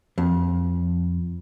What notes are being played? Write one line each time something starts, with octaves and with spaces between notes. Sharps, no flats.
F2